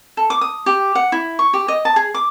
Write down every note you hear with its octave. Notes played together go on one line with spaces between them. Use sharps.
A4
D6
D#6
G4
F#5
E4
C#6
G4
D#5
A5
G#4
D6